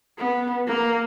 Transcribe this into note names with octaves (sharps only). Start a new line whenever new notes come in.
B3
A#3